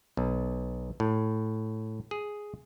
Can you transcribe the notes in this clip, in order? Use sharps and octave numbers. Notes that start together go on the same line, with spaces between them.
B1
A2
G#4